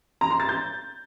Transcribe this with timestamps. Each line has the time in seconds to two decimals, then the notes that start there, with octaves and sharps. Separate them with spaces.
0.21 A#5
0.30 C6
0.40 A6
0.49 G6